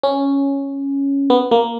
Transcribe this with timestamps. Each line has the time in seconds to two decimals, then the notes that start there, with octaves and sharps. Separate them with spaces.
0.03 C#4
1.30 B3
1.51 A#3